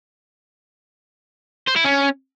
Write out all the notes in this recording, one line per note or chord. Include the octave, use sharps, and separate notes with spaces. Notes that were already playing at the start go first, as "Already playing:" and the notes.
C5
E4
C#4